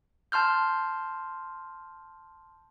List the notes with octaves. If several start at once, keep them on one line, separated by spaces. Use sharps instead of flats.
A5 C6 F6 G6